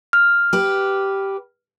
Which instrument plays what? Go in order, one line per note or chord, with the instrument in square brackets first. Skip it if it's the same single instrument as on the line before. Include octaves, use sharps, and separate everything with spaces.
[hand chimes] F6
[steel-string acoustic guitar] G4 B4